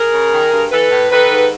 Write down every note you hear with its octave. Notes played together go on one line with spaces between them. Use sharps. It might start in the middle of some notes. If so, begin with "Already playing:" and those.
Already playing: G#4 A#4
C#3
D#3
G2
E3 A4 B4
A2
D#3 A4 B4
G#2